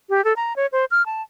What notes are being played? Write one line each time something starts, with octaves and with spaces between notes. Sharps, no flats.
G4
A4
A#5
C#5
C5
F6
A5